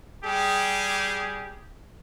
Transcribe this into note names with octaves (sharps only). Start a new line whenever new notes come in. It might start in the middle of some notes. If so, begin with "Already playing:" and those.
G3 G4 G#4